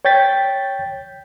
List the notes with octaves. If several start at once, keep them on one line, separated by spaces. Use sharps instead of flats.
C#5 G5 G6 A6 B6